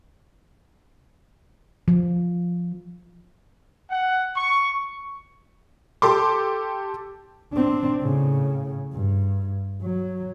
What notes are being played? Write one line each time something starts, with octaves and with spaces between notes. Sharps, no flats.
F3
F#5
C#6
G4 A4 C6 D6
C4 D4
A2 C#3
G2
F#3